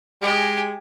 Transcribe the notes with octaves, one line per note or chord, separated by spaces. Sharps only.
G#3 G4 G#5